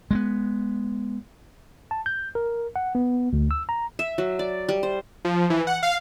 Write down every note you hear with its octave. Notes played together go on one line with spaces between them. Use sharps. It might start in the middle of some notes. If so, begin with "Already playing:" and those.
G#3 A3 B3
A5
G6
A#4
F#5
B3
D2
E6
A#5
E5
F#3
D5
G3
C5
F3
E3
F#5
F5